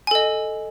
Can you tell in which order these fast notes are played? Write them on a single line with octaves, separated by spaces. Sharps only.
G#5 A4 D#5